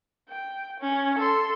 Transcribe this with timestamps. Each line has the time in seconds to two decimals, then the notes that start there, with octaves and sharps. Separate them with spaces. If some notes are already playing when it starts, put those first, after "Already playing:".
0.29 G5
0.80 C#4
1.18 A4 C6